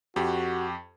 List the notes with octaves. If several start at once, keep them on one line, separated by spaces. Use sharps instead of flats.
F2 F#4 G4